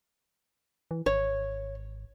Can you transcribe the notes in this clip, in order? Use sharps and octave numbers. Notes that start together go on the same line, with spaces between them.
E3
G#1 C#5